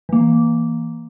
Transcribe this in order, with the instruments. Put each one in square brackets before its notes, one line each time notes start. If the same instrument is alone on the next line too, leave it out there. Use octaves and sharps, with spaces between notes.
[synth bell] E3 A#3